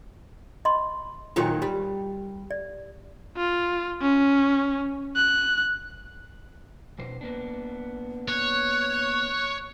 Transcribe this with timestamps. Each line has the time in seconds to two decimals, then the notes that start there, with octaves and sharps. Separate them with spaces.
0.65 D#5 B5 C6
1.36 A#2 D#3 F#3 F4 F#4 G5
1.62 G3
2.51 D5
3.37 F4
4.02 C#4
5.16 F#6
6.98 F2 B2 C5
7.21 A#3 B3 D4
8.28 C#5 F#6